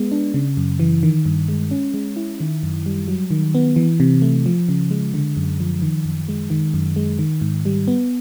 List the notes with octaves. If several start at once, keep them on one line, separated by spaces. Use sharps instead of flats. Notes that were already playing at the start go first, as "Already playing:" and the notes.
Already playing: G#3 B3
D4
C#3
F#2
E3
D#3
G2
G#3
C#4
G#3
E4
D#3
F#2
G3
F#3
D#3
B3
E3
C3
A3
F3
C#3
G#3
D3
F#2
F3
D#3
F#2
G#3
D#3
F#2
G#3
D#3
G#2
G3
B3